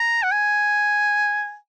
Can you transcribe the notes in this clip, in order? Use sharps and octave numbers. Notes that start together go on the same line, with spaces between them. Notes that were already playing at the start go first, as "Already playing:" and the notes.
Already playing: A#5
F#5
G#5